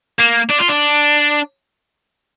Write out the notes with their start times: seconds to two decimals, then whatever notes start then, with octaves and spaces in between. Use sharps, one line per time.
0.19 A#3
0.49 D4
0.59 F4
0.68 D4